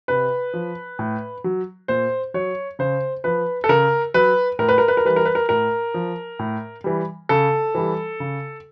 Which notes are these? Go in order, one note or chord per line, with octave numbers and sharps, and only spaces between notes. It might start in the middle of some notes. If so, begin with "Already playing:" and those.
C3 B4
F3
A2
F#3
A#2 C5
F#3 C#5
C#3 C5
F3 B4
A4
C#3 A#4
F#3 B4
A2 A#4
B4
A#4
B4
A#4
E3 G3 B4
A#4
B4
A#4
A2 A#4
F3
A2
E3 G3
C#3 A4
E3 G3
C#3